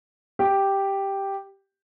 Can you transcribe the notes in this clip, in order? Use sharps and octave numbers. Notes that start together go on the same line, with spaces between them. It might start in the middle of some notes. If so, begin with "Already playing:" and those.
G4